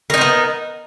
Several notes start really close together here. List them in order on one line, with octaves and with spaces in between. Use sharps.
A#4 D#4 C4 B3